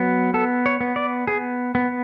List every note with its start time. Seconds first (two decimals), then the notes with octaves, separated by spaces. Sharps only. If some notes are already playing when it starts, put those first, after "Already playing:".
Already playing: F#3 B3
0.34 B3 A4
0.66 C#5
0.81 B3
0.96 D5
1.27 B3 G#4
1.75 B3